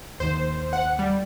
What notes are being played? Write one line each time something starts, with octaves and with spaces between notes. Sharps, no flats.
D#2 D#3 C5
F#5
G3